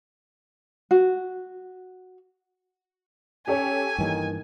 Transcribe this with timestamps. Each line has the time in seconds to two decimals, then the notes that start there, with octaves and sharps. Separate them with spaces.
0.91 F#4
3.48 C#4 G4 A4 C#5 G#5
3.98 G2 D#3 E3 A#3